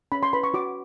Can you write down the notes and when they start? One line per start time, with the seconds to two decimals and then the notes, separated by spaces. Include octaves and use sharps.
0.12 C#4 B5
0.23 C6
0.33 B4 B5
0.44 C#6
0.54 F#4 D6